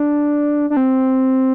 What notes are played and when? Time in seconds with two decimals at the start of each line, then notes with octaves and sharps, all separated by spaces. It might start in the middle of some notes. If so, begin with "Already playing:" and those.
Already playing: D4
0.70 D4
0.77 C4